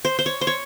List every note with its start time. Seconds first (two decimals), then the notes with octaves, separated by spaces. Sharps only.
0.05 C5
0.19 C5
0.26 C#5
0.41 C5
0.47 C#5